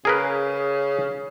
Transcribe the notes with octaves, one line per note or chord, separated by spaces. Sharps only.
C#3 G#4 A#4 B4